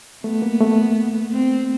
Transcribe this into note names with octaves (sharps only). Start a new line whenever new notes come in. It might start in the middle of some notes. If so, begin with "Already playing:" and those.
A3 B3
A#3
A3
C4